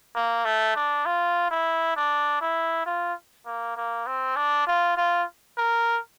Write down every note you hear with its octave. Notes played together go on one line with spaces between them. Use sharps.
A#3
A3
D4
F4
E4
D4
E4
F4
A#3
A#3
C4
D4
F4
F4
A#4